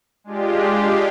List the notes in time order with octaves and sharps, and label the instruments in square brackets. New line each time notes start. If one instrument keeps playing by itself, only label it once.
[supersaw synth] G#3 D4 F4 G4